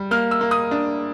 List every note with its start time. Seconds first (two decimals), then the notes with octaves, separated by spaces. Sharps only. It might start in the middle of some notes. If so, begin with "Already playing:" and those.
Already playing: G3
0.11 A#3 F6
0.31 E6
0.41 A#3
0.51 D#6
0.71 D4